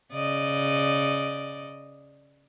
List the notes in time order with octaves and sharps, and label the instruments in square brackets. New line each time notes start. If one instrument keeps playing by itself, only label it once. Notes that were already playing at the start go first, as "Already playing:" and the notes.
[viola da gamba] C#3 D5 D#5